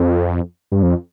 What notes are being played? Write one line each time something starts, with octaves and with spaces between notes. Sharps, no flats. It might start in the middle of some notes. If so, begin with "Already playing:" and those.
Already playing: F2
G2
F2